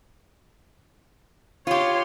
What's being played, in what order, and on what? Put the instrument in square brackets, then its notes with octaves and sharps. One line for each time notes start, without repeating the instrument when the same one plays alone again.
[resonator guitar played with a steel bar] F4 G4 [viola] C#5 C6